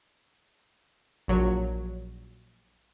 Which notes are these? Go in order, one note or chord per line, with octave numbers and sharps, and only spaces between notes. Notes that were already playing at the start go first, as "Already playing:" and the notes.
A#1 F#3 C#5